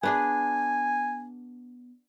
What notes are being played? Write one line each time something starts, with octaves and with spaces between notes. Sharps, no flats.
B3 D4 G#4 G#5